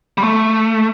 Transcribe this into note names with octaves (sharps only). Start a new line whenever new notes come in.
G3
A3